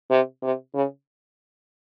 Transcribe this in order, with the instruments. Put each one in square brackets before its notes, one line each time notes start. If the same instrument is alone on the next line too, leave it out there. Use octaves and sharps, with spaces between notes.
[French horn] C3
C3
C#3